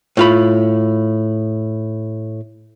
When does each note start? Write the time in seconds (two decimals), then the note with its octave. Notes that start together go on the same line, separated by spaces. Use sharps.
0.17 A2 F4 B5